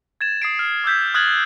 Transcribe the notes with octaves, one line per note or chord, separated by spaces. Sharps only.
G#6 A6 E7
D#6 C7 D7
F6 D7
D6 E6 G6 B6
D#6 F6 F#6 G#6 A6 F#7